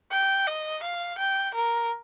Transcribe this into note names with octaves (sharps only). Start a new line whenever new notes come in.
G5
D#5
F5
G5
A#4